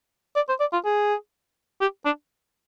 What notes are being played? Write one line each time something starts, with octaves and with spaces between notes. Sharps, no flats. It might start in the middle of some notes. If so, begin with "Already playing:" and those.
D5
C5
D5
F4
G#4
G4
D4